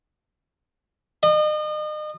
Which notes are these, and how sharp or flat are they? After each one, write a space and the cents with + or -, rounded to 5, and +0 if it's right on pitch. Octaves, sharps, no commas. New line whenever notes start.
D#5 -35